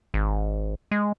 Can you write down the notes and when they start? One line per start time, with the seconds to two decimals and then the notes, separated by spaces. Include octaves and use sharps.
0.14 G#1
0.91 G#3